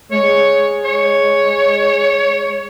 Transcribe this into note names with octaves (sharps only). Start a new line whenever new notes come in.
G#3 C#5
C#5